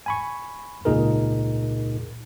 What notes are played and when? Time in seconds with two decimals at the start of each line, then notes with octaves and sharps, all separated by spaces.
0.06 G#5 B5 C#6
0.85 C#2 A#2 D#4 G#4 A#4